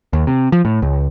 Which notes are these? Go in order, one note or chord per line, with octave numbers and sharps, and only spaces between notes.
D#2
C3
F3
A2
C#2